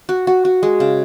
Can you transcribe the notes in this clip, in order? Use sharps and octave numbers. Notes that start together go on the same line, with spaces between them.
F#4
F#4
F#4
G#3
C#3